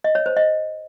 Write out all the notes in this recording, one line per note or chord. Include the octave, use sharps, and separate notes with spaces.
D#5
C#5
C5
D#5